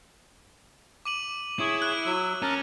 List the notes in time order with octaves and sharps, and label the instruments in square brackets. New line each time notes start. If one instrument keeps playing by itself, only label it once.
[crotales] D6 D#7 F#7
[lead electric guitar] E4 [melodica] G#4 C#5
[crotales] F#6
[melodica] F#3 E6
[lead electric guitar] C#4 [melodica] A#4 A5 A#5